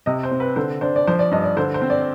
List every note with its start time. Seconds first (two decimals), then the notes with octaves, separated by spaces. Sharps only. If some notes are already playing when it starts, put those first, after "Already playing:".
0.06 C3 D#5
0.23 C5
0.31 C4
0.40 B4
0.56 D3 C5
0.81 D4 C5
0.96 D5
1.07 F3 C5
1.19 D5
1.31 G2 D#5
1.44 D5
1.57 D3 C5
1.74 C5
1.82 C4
1.90 D5